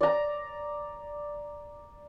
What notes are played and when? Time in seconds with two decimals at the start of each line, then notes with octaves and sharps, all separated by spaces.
0.01 D5 A#5